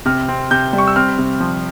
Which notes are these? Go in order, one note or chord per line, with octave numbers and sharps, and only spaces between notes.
C3 F6
C4
C3 G6
G3
C#6
E6
C4 F6
C3
F3